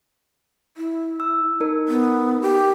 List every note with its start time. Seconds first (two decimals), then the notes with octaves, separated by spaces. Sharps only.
0.77 E4
1.20 E6
1.60 D#4 A#4
1.88 B3
2.42 G4